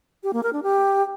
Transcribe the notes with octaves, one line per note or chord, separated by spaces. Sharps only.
G4
A#3
A#4
D4
G4